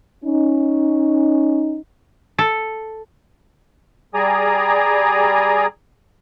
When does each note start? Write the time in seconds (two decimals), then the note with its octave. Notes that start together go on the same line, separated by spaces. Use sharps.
0.24 C#4 D#4
2.38 A4
4.14 G3 G#4 D5 G#5 A#5 D#6